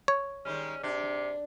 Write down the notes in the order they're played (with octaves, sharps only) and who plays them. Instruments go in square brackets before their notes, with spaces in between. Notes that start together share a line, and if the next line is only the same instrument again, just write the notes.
[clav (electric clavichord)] C#5
[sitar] D#3 G3 G#3 [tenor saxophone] C#4
[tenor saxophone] C3 [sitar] D4